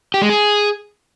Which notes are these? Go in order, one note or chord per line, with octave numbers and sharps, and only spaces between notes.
G4
G#3
G#4